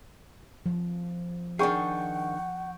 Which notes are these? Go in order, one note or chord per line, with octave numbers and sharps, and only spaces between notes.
F3
D#3 D4 G#4 F#5 G5 C#6